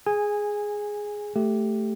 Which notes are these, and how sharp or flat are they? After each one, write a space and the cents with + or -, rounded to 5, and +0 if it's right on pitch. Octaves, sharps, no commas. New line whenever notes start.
G#4 +0 G#5 -15
A3 +0 G4 +0